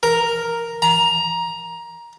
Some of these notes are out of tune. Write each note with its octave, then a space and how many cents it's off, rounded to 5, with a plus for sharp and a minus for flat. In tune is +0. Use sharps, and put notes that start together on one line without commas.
A#4 +0
A#5 +15